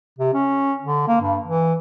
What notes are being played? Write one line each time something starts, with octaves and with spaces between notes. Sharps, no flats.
C3
C#4
D3
A#3
G2
E3